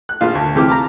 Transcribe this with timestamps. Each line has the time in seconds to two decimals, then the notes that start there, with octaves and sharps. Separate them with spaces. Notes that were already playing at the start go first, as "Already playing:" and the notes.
0.09 F#6
0.21 A#1 F4
0.35 D2
0.55 C3 E3 G4 D6 F6
0.70 A5 A#5